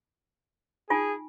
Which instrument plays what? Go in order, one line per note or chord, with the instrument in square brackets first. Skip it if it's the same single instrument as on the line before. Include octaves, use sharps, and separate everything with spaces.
[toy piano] D#4 F4 G#5 [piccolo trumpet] G#4